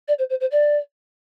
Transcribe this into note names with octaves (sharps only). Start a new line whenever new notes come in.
D5
C5
C5
C5
D5